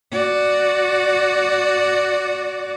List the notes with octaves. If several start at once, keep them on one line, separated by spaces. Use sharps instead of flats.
F#4 D5